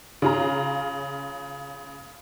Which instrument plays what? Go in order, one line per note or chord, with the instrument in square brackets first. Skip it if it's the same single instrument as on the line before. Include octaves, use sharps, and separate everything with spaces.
[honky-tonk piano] C#3 C#4 F4 G#4 A#5